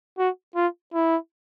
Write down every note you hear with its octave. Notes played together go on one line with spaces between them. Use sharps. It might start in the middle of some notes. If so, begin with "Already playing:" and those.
F#4
F4
E4